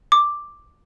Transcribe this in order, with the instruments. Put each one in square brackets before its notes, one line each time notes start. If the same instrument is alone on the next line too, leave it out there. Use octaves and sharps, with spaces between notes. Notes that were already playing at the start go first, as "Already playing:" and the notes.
[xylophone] D6